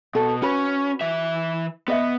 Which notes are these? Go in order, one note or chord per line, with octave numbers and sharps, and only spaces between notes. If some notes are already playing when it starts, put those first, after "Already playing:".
B2 A4
C#4 F#4 B4 B5
E3 E5
B3 B4 D#5 E5